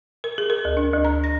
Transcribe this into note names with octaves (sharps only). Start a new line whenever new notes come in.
A#4
G#4
A#4
D2
D4
D2
A#5
A#6